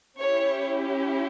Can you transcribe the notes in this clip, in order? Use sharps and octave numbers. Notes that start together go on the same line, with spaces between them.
C#4 E4 G4 C#5